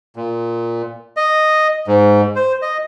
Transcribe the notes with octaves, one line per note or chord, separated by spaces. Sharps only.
A#2
D#5
G#2
C5
D#5